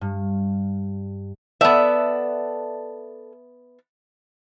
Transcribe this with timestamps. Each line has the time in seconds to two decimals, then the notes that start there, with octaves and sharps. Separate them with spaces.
0.01 G2
1.61 B3 A4 D5 E5 F#5